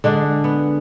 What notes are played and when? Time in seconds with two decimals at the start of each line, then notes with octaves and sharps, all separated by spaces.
0.04 D3 G#3 D4
0.44 B3